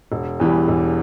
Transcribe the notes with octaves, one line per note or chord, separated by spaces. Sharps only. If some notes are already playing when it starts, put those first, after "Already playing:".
E1
E2 E3 G3
E1